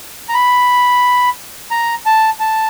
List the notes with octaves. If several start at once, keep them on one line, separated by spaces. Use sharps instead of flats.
A#5
B5
A#5
A5
A5